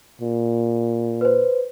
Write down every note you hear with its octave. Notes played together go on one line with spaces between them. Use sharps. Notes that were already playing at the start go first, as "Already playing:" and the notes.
A#2
B4 C5